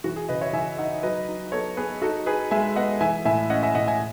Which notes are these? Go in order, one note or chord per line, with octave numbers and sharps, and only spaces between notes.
E3 F#4
G#4
C#3 B4 D#5
C#5 E5
E3 E5 G#5
D#4 D#5 F#5
F#3 B4 D#5
D#4
B3 A4 C#5
B3 G#4 B4
D#4 F#4 A4
D#4 G#4 B4
G#3 E5 G#5
B3 D#5 F#5
E3 E5 G#5
A2 E5 G#5
C#4 D#5 F#5
E5 G#5
A2 D#5 F#5
E5 G#5